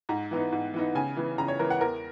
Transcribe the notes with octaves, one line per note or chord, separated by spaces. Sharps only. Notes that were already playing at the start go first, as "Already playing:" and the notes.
G#2 A#5
E3 B3 D#4
G#2
E3 B3 D#4
C#3 G#5
E3 B3
C#3 A#5
C#5
E3 B3 A#4
F#5
E2 A#4